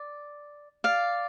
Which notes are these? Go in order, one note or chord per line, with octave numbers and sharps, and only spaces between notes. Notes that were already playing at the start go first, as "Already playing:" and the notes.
Already playing: D5
D5 F5